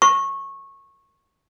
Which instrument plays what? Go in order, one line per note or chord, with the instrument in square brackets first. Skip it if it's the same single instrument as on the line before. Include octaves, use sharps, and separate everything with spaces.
[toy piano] C#6